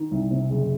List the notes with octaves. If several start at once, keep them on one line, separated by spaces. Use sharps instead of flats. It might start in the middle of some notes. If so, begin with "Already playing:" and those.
Already playing: D#3
C2
C3
F#1